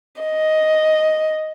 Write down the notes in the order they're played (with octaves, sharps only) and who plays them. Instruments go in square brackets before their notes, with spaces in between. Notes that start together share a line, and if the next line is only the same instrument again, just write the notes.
[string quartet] D#5